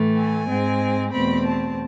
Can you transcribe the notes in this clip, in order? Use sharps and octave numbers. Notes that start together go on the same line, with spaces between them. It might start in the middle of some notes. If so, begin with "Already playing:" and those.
Already playing: A2 E3 A3
G#5
G#2 G#3 C4
E2 B2 A3 C4 B5
A5